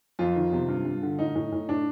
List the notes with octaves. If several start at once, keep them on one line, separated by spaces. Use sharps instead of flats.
F2 F4
D#3
C3
G2
G2
D3
A2 D#4
A2
A2
A2 D4